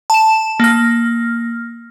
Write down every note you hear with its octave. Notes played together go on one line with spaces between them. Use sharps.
A5 E7
A#3 F6